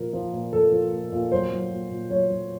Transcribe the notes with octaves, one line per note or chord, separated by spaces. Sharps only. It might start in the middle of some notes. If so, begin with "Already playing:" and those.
Already playing: A#2 F3 A#4
F3
A#2
F3 A4
F3
A#2
A#2
F#3 C5
F#3
A#2
A#2
F#3 C#5
F#3